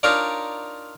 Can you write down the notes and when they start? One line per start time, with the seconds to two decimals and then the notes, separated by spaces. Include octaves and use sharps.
0.03 D4 D#4 F4 A#4 C#5 D5